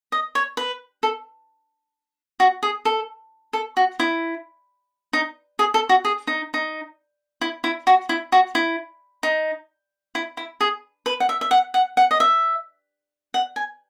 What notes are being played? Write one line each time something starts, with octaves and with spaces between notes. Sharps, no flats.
D#5
C#5
B4
A4
F#4
G#4
A4
A4
F#4
E4
D#4
G#4
A4
F#4
G#4
D#4
D#4
E4
E4
F#4
E4
F#4
E4
D#4
E4
E4
G#4
B4
F#5
E5
E5
F#5
F#5
F#5
D#5
E5
F#5
G#5